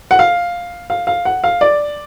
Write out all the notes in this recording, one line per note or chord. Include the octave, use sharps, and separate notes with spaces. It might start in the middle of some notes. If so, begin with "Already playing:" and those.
F#5
F5
F5
F5
F#5
F5
D5